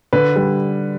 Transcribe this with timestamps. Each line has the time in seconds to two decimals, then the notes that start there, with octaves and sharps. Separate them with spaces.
0.13 D3 B4
0.36 G3